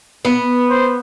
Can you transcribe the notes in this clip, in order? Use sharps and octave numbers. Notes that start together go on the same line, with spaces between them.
B3
C5